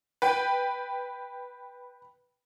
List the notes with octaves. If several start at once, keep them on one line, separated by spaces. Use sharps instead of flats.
B4 G5